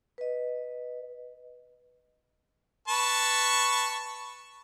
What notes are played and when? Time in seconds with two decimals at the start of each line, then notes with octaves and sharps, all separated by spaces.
0.18 B4 D#5
2.88 B4 A5 C#6